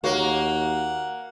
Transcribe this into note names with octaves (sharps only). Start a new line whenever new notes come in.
D#2 A#3 F#4 C#5 F#5